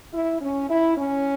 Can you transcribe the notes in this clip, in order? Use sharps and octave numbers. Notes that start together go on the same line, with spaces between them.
E4
C#4
E4
C#4